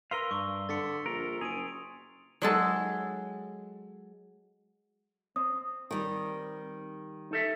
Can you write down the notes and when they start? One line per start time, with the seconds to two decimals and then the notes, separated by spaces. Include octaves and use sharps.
0.11 A#4 B4 F5 C6 E6 G7
0.31 G2 C#6
0.69 D3 A6 B6 C#7
1.06 A#1 A#4
1.41 F#1 G#4 D7 D#7 F7
2.42 F#3 G#3 A4
5.36 C4 D#6
5.91 D#3 G3
7.31 D#4 A4 E5